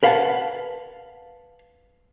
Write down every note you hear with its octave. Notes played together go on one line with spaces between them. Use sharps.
A#4 B4 F5 F#5 G#5 A5